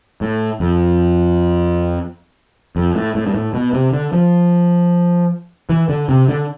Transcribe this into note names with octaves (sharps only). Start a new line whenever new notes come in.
A2
F2
F2
A2
A2
G2
A2
B2
C3
D3
F3
E3
D3
C3
D3